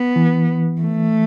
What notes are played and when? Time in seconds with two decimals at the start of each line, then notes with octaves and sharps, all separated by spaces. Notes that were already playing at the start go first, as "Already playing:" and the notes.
Already playing: B3
0.16 E3
0.81 A3